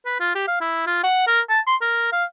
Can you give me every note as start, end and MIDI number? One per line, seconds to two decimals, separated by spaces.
0.06 0.19 71
0.20 0.33 65
0.35 0.43 67
0.48 0.58 77
0.61 0.84 64
0.87 1.03 65
1.04 1.25 78
1.27 1.41 70
1.49 1.60 81
1.67 1.76 84
1.81 2.09 70
2.13 2.24 77